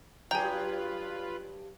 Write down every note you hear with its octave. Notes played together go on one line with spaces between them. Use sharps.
G2 F#3 F4 G#4 B4 G5 G#5 A#5